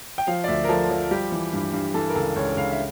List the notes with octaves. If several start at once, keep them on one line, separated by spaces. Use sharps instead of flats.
G5
F3 F5
D5
D2 E5
A#4
F3 A4
F3
G3 G4
E3
G2
G2
E3 A4
A#4
C#2 A4
C#2 C#5
C#2 F5
E5